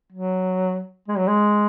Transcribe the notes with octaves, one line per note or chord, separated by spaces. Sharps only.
F#3
G#3
F#3
G#3